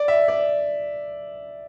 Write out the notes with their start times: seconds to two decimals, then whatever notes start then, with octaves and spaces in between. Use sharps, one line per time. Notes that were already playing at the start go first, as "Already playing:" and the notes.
Already playing: D5
0.08 E5
0.28 D5